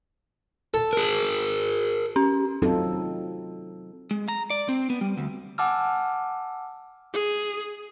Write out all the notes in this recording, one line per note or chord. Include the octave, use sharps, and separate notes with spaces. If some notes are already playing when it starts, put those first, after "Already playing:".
A4
G#4 A#4
C#4
F#3 C4 D#4 F4 A4
G#3
A#5
D5
C4
B3
G3
D2
F#5 G#5 A5 D6 E6 F6
G#4